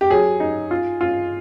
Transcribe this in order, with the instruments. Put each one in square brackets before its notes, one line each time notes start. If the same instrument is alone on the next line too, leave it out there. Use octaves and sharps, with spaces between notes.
[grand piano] G4
F#3 G#4
D#4
F4
F4